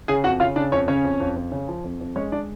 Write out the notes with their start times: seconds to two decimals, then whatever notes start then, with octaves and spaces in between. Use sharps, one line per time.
0.08 C#3 G#4 G#5
0.24 F2 F#4 F#5
0.40 C#3 F4 F5
0.56 C#3 D4 D5
0.72 F2 C#4 C#5
0.88 C#3 C#4 C#5
1.04 F2
1.20 F2
1.36 F2
1.52 C#3
1.68 F3
1.84 F2
2.01 F2
2.16 G#3 C#4 C#5
2.32 G#3 D4 D5